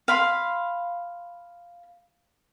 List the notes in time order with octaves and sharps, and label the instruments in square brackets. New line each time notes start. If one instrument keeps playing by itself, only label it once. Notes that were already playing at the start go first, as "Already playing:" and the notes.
[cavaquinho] F5 B5 C6